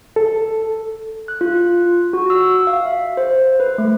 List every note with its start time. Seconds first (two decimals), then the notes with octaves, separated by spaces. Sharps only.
0.16 A4
1.28 F#6
1.41 F4
2.13 F#4
2.30 E6
2.67 F5
2.85 E5
3.17 C5
3.60 B4
3.78 A3